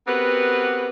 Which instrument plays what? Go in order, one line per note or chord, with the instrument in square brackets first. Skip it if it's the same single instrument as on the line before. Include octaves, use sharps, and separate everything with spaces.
[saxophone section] B3 C4 F#4 G4 A#4 B4